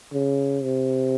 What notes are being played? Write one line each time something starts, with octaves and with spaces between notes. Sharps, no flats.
C#3
C3